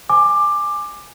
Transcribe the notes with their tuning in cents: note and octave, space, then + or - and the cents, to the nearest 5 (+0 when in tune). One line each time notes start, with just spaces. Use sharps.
G#5 +0 D6 +15